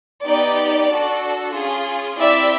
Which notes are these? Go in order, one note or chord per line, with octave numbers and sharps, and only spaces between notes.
B3 D#4 G4 D5
D4 F#4 A4
C#4 F4 G#4
C4 E4 G4 D5 E5